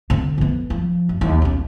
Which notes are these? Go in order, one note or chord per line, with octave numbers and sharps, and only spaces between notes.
D3 C4
F2 B3
F3
F#2
D#2
B1 C#4